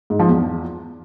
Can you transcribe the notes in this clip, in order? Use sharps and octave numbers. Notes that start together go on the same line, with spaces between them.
G#2
F3
E2